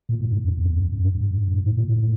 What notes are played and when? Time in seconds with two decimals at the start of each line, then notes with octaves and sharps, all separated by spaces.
0.09 A#2
0.20 A2
0.32 G#2
0.44 F2
0.57 E2
0.69 E2
0.81 F2
0.93 F#2
1.04 G2
1.20 G2
1.38 G2
1.54 G#2
1.66 A2
1.77 A#2
1.89 A2